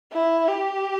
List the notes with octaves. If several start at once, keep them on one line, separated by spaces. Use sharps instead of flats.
E4
G4